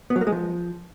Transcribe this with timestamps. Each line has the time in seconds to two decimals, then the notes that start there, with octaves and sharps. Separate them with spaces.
0.10 B3
0.16 F#3
0.21 A#3
0.27 G#3
0.32 F3